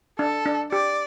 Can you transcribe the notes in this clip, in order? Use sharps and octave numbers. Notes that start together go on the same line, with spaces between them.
D4 A4
D4
G4 D5